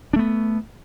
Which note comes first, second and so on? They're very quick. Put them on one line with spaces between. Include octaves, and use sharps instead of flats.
D4 A3 B3